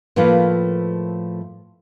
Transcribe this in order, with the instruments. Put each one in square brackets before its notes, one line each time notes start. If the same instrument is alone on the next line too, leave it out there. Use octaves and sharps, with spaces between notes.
[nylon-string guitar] A2 F3 A3 A#3 F4 B4